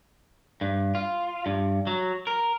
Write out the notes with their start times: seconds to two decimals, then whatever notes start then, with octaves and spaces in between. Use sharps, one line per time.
0.61 G2
0.95 F4
1.46 G2
1.87 F#3
2.27 A#4